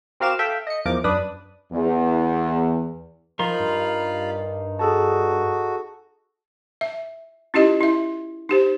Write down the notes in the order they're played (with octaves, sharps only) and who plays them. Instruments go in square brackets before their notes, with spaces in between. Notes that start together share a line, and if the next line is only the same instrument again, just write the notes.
[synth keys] C4 F#4 A#4 F5 D6 E7
A4 E5 F5 G5
D#5 C#7
E2 F3 A#4 D6
F#2 D4 B4 D#6
[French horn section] E2
[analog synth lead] F3 [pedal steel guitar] D#4 A#4 C6 [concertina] F4 F5 B5
[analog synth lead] G2
[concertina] F#4 [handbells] G#4 A4 A5
[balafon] E5
C#4 E4 F4 G4 D#5
E4 E5
D#4 G4 C5